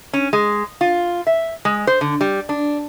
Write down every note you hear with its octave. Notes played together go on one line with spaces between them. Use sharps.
C#4
G#3
F4
E5
G#3
C5
D3
G3
D4